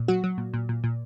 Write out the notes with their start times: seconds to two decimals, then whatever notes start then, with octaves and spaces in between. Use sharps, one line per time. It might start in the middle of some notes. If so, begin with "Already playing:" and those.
Already playing: A#2
0.08 F#3 F#4
0.24 F#3
0.38 A#2
0.54 A#2
0.69 A#2
0.84 A#2